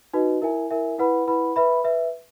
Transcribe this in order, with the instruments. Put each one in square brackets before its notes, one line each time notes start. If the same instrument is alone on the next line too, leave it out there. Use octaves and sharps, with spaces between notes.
[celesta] D#4 F#4 B4 D#5
E4 A#4 E5 G#5
E4 A#4 E5 G#5
E4 B4 F#5 B5
E4 B4 F#5 B5
B4 E5 B5
B4 E5